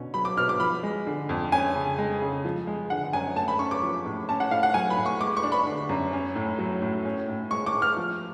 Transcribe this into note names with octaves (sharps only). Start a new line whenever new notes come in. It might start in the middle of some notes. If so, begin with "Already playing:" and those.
Already playing: B2 D3 C#4
F#3 B5
D6
B2 F6
D6
F3 B5
G#3
D3
F2
C#4 G#5
C#3
G#3
C#3
F3
G#3
D3 F#5
F#2 G#5
A3 A5
B5
C#4 C#6
D6
F3
A2
C#4 A5
F#5
A2 F5
F#5
F#3 G#5
B5
A2
C#6
G#3 D6
C#6
D4
B5
D3
F#2
C#4
A2
F#3
A2
C#4
A2
G#3 C#6
D6
A2
F6
F3